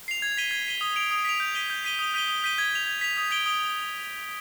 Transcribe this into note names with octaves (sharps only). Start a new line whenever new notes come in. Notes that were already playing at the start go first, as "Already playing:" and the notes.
C7 F7
G#6
B6 D#7 G7
G#6
B6 D#7 G7
D#6
B6 D7 F7
D#6
B6 D7 F7
G6
B6 D#7 G7
G6
B6 D#7 G7
D#6
G6 B6 D#7 G7
D#6
G6 B6 D#7 G7
G#6
B6 F7
G#6
B6 F7
D#6
G#6 D7 G7
D#6